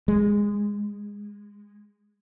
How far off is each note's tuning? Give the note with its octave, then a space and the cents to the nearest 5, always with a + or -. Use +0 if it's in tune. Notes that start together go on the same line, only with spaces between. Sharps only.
G#3 -15